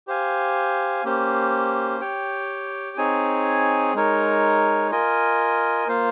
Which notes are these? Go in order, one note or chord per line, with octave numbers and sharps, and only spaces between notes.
G4 C5 F5 G#5
A#3 C#4 G4 C5
G4 C#5 G5
C4 D#4 G#4 C#5 G#5
G#3 D#4 A#4 C#5
F4 A#4 D#5 G#5
A#3 F4 C5 F5